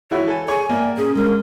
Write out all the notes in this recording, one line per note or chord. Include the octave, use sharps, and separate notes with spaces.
E3 E4 F#4 C#5
A4 G#5
G#4 C#5 G#5
A#3 D5 E5 F5 G5
A#2 C#4 G#4
G#3 D4 A#4